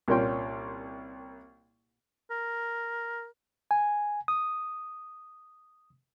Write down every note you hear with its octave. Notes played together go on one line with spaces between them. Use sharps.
C2 A#2 A#3 C#4 G5 C6
A#4
G#5
D#6